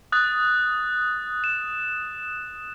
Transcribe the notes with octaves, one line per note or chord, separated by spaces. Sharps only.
D#6 F#6 A6
E7